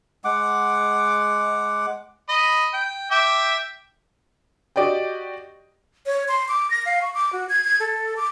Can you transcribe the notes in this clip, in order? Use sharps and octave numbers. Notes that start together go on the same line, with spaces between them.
G#3 F#5 D6
D#5 B5
G5
E5 G5 D6
F#4 G4 D5 D#5 G5
C#5
C6
D6
A#6
F5
C#6
D6
F#4
G#6
G#6
A4
D6